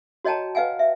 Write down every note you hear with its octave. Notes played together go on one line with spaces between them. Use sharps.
F#4 C#5 D#5 G5 A5 A#5
B4 D#5 F5 F#5 G#5
E5